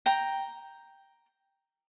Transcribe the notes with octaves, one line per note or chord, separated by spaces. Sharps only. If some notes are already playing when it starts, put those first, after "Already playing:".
G5 A#5